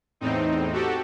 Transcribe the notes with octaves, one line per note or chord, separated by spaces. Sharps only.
E2 A2 C4 D#4
F#4 G4 A4